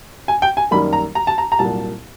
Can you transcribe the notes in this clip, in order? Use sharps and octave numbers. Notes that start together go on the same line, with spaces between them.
G#5
G5
G#5
F#2 D#3 G3 A#3 B5
A#5
A#5
A5
A#5
A#5
C2 A#2 F#3 A#3 A5